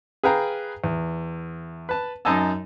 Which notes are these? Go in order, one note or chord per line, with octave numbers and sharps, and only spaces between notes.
G#4 B4 F5 G5 A#5
E2
B4 A5
F#2 D#4 D#5 G#5 A5 E6